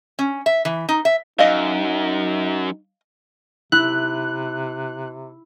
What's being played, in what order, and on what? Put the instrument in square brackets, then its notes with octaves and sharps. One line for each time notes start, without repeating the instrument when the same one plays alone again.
[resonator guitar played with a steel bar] C#4
E5
E3
D#4
E5
[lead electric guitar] F#2 [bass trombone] D#4 [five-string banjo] D#5 F5
[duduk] C3 [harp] E4 [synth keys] F#6